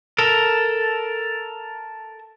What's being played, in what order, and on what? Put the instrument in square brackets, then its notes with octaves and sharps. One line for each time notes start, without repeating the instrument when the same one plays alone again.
[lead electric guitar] A4 A#4